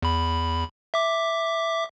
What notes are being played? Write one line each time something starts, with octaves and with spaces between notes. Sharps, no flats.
E2 B5
E5 D6